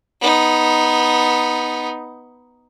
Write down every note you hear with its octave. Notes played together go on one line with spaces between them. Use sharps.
B3 D#4